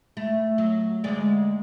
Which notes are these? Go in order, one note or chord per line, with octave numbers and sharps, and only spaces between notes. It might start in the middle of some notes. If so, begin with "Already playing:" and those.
A3
F#3
D2 G#3 D5